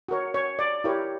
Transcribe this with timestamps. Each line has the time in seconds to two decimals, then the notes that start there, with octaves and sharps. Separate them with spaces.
0.08 F#4 A#4 C#5
0.34 C#5
0.59 D5
0.84 E4 G4 A#4 C#5